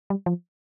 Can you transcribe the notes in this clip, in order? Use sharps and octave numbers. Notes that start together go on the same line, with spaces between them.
G3
F3